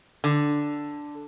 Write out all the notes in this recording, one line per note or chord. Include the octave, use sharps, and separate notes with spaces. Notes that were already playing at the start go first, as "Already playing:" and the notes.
D3